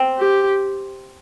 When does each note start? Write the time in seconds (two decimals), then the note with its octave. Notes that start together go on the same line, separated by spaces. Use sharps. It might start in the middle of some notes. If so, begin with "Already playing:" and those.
Already playing: C4
0.19 G4